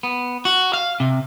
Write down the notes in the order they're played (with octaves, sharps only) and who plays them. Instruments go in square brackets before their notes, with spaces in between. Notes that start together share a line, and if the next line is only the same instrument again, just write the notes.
[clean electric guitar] B3
F#4
F5
C3